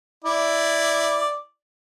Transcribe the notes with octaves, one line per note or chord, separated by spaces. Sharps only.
E4 D5